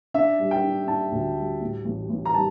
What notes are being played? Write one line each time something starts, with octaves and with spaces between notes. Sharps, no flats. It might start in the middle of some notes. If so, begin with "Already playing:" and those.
D4 E5
G3
G5
D4
D4 A5
D2
G3
A2
A1
A1
A#5
G3 A5